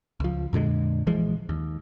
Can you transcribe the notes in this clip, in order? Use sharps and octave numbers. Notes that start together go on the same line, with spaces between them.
C#2 F3
F2 A#2 D3 G#3
A#1 E3 F3 G#3
D#2